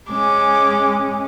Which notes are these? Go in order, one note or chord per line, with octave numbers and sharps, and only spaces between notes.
G#3 C#4 D6